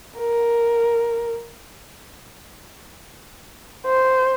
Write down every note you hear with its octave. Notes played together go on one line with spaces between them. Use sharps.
A#4
C5